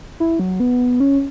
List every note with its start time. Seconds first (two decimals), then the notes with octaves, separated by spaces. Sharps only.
0.20 E4
0.40 F#3
0.60 B3
1.00 C#4